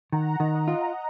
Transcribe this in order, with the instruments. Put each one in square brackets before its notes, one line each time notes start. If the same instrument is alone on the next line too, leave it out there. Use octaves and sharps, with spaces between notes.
[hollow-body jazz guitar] D#3 [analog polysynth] F#5 A#5
[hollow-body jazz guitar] D#3
[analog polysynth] D#5 F#5
[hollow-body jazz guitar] F4